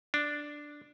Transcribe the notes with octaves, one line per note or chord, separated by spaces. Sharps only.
D4